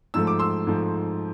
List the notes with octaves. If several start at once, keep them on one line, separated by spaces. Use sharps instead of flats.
G#2 F3 A3 E6
D6
C6 E6
G#2 F3 A3